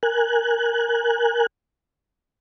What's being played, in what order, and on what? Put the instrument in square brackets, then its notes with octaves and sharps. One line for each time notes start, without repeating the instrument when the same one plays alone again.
[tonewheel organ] A#4 G#5 F#6